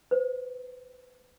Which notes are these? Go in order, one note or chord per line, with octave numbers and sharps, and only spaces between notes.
B4 C5